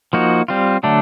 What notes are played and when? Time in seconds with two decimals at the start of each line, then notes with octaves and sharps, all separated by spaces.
0.13 F3 A#3 D#4 F#4
0.48 G3 C4 F4
0.83 D3 F#3 A3 D4